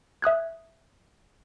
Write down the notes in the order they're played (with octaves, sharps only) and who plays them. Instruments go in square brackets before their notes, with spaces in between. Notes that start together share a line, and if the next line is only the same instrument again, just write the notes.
[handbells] E5 D#6 F#6 G#6